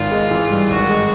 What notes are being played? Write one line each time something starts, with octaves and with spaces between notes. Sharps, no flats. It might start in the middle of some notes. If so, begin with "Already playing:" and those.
Already playing: G#1 F4
G#3
E3
G2
G#1 F#4
G#3